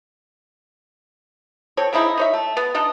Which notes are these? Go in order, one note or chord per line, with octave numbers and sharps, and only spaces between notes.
C4 A4 C#5
C#3 C4 D#4 E4
D#4 C#5 E5
A3
B3
D4 D#4 D#5